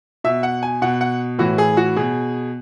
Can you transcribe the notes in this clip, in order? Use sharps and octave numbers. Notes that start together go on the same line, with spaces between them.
B2 E5
F#5
G#5
B2 F#5
F#5
A2 E3 F#4
G#4
F#4
B2 G#4